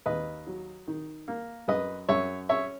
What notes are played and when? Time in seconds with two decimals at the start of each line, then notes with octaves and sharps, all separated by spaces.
0.06 D#2 B4 D#5
0.47 F#3
0.87 D#3
1.28 A#3
1.68 F#2 B4 D#5
2.09 F#2 C#5 E5
2.49 C#4 C#5 E5